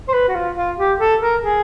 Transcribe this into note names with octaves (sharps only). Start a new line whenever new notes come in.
C5
B4
F#4
F4
F4
G4
A4
A#4
G#4